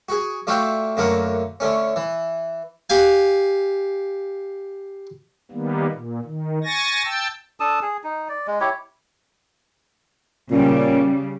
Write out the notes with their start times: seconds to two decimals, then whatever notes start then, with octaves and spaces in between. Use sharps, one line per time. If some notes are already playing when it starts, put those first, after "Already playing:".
0.09 F#4 G#4
0.47 A3 D4 F4 F#4 E5 G5
0.97 F#2 D3 A3 A#3 A#4 F#5
1.60 D3 A3 C#4
1.96 E3
2.90 G4 F5 G#5
5.52 D#3 G3 A#3 B3
5.92 A#2
6.25 D#3
6.64 G#5 C#6 A6 A#6
7.04 G5 A5 E6
7.60 D4 A4 A5 D#6
7.82 G#4
8.04 D#4
8.29 D5
8.47 G#3
8.60 E4 G4 C#5
10.50 A#2 C#3 G3 C#4